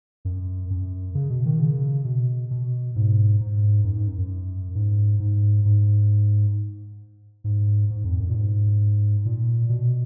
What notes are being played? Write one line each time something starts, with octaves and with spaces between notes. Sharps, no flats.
F#2
F#2
C#3
B2
D#3
C#3
B2
B2
G#2
G#2
F#2
G#2
F#2
F#2
G#2
G#2
G#2
G#2
G#2
F2
F#2
A#2
G#2
A#2
B2